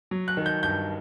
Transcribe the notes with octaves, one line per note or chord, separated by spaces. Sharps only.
F#3
F#6
D#3
G6
G2 G6